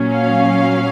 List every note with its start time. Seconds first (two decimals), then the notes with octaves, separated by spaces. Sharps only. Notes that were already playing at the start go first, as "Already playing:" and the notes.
Already playing: A#2 F#3 C#4
0.15 F5